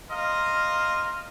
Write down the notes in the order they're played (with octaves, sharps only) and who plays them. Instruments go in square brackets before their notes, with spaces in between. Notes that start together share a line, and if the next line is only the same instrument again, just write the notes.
[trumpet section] A#4 D#5 F5 [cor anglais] C5